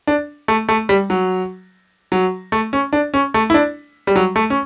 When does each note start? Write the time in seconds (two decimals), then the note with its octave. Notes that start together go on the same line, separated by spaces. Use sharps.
0.07 D4
0.48 A3
0.69 A3
0.89 G3
1.10 F#3
2.12 F#3
2.52 A3
2.73 C#4
2.93 D4
3.14 C#4
3.34 A3
3.50 E4
3.54 D4
4.07 G3
4.16 F#3
4.36 A3
4.50 C#4